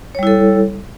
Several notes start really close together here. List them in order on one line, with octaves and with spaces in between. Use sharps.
C#5 G3 E4 A4